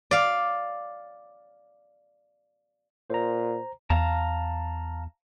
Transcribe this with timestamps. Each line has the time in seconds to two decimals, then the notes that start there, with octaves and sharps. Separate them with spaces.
0.11 D5 F5
3.10 A#2 C5 A#5
3.90 E2 F5 A5 A#5